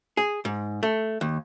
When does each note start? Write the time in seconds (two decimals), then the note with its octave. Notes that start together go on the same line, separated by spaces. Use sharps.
0.17 G#4
0.45 G#2
0.83 A3
1.21 D#2